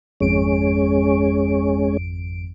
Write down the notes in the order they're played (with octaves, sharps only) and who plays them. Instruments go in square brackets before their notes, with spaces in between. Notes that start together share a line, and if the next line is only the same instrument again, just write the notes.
[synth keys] G#1 F2 D7 [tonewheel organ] G#3 C#4